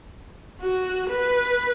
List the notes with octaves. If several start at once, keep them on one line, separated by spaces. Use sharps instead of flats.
F#4
B4